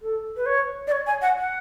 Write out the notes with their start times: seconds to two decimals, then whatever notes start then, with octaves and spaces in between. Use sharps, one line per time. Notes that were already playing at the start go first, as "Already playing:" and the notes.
0.02 A4
0.36 B4
0.46 C#5
0.87 D5
0.92 C#5
1.07 G#5
1.22 F#5
1.38 F#5